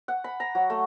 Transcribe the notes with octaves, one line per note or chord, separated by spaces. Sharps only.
F#5
B5
A#5
F#3
A3